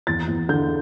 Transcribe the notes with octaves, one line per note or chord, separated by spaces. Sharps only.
E2 A6
E2
D3 G6